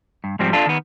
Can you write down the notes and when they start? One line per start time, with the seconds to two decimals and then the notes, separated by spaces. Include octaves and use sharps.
0.24 G2
0.39 G#2 F3 G3 C4
0.53 D4 F4 A4
0.66 D#3 B3